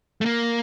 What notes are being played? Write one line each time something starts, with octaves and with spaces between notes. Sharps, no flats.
A3
A#3